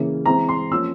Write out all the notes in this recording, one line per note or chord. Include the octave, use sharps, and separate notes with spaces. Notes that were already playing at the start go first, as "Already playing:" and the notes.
Already playing: C#3 E3 A#3 C#4
E3 G#3 C4 A#5
C6
F3 A#3 C#4 E6